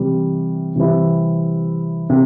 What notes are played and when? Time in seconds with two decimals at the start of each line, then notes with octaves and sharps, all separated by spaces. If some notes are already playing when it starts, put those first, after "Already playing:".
Already playing: C3 E3 G3
0.75 C3 E3 G3 C4 E4
2.10 C3